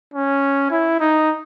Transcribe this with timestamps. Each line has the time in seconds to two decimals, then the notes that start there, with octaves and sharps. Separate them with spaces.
0.14 C#4
0.71 E4
1.00 D#4